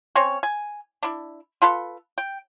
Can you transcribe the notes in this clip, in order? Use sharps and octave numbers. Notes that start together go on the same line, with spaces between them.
C4 C#4 C#5
G#5
D4 E4
F4 A4 B4
G5